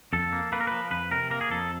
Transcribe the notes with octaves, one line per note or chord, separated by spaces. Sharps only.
F2 A4
A#3
A#3 B4
A#4
F3 B4
F2 B4
C3 A#4
A#3 A#4
G#4
F2 A4